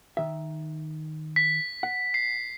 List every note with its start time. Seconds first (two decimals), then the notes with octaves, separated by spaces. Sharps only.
0.17 D#3 E5
1.36 B6
1.83 F#5
2.14 C7